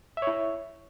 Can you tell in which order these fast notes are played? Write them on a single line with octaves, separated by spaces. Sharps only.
E5 C#5 E4